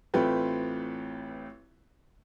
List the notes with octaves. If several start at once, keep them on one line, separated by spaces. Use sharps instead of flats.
A1 A3 C4 F4 B4 G5